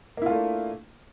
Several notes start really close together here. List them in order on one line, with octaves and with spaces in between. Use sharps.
A#3 E4 F4 A3 D4